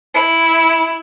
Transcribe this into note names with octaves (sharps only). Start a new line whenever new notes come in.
E4